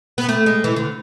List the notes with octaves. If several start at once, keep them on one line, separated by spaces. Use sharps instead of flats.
B3
A3
G#3
E3
D3